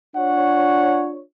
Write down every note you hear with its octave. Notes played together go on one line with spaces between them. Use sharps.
D4 F4 C#5 F#5